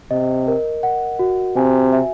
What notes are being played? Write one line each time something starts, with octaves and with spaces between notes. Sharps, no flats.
C3 D#5
A#4
F#5
F#4
C3 G#5
E5